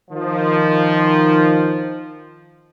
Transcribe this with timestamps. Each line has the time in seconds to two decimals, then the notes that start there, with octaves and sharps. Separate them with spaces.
0.11 D#3 F3